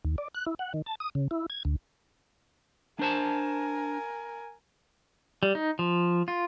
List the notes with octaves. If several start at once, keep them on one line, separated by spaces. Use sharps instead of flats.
D#2
D5
F#6
E4
F#5
D#3
A5
D#6
C#3
E4
G#6
D2
D4 A#4 C5 G#5 A5
G3
D#4
F3
F4